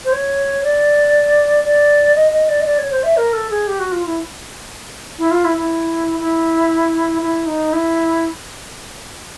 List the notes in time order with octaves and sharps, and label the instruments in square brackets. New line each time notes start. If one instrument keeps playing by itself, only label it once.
[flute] C5
C#5
D5
D5
D#5
D#5
D5
D#5
D5
C#5
C5
E5
A#4
A4
G#4
G4
F#4
F4
E4
E4
F4
E4
E4
E4
E4
D#4
E4